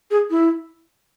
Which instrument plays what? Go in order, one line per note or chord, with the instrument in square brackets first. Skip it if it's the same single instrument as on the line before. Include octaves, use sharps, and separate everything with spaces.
[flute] G#4
E4